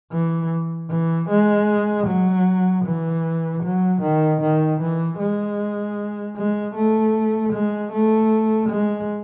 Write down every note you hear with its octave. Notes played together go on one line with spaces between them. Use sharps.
E3
E3
G#3
F#3
E3
F#3
D#3
D#3
E3
G#3
G#3
A3
G#3
A3
G#3